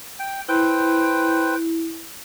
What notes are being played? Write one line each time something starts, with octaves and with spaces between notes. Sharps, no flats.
G5
E4 B4 C5 G5